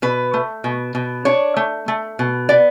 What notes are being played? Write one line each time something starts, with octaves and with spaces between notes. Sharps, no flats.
B2 B4
A3
B2
B2
D4 C#5
A3
A3
B2
B3 D5